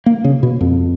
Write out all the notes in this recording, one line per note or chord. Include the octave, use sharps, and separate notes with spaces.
A#3
C#3
B2
F2